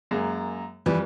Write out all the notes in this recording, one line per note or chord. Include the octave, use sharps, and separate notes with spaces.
F#2 G#3 A#3
F2 E3 G3